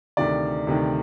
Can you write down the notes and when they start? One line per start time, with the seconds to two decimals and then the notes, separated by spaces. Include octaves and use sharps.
0.17 D2 C3 D#3 D5
0.67 D2 C3 D#3